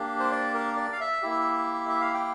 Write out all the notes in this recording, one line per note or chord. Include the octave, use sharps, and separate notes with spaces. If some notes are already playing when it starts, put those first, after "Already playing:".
Already playing: A#3 D4 G4
C5
D5
A#4
D5
F5
E5
A#3 E4 G4
E5
F5
G5